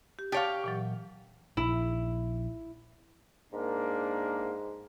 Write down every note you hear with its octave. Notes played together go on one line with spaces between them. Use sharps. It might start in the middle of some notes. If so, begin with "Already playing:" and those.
G4
G4 C#5 F5 A5 A6
A#2 E3 F#3
A#1 E4
G#2 A#3 D4 A#4